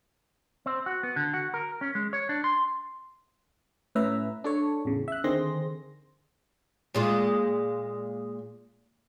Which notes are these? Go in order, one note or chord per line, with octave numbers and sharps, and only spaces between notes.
C4
F#4
B3
D3
F#4
A#4
C#4
G#3
C#5
D4
C6
A2 C#4 B4 E5 A#5
D4 A4 C#5
A1 E2 C#3
E5 F#6
D3 D#3 C4 G#4 C6 A#6
A#2 G#3 F4